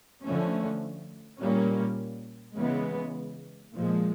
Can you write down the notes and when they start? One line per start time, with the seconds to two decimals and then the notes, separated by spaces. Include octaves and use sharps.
0.23 D3 F3 A3 C#4
1.39 A#2 G3 A#3 C#4
2.55 C#3 E3 G#3 B3
3.73 A#2 F3 G#3